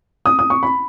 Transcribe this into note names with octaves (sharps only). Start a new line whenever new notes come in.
D#6
D#6
C#6
B5